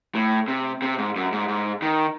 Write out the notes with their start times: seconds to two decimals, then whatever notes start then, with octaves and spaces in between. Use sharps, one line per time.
0.15 A2
0.48 C3
0.82 C3
0.98 G#2
1.16 F#2
1.32 G#2
1.48 G#2
1.82 D#3